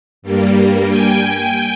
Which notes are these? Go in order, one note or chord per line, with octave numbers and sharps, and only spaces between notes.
G2 G3 A#3
G5 G#5